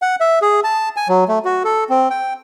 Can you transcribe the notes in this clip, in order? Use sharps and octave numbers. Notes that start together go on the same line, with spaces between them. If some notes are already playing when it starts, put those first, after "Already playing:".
F#5
E5
G#4
A5
G#5
F#3
A3
F#4
A4
C4
G5